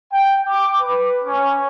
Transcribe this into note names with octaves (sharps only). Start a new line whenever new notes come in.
G5
D6
B4
C#4